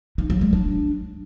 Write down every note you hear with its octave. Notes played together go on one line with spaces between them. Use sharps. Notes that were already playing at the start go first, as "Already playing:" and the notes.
D#4
F#3
G#3
D4